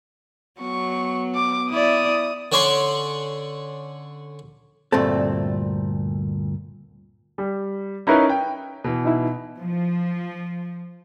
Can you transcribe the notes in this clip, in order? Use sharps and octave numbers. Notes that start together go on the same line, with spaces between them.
F#3 B3 C#6
D6
E4 D5 D#6
D3 C#4 C#5 D5 C6
D2 G2 A#2 A3 C4 A4
G3
C#4 D#4 E4 A#4 B4 D#5
G5
B2 E3
D#4 E4
F3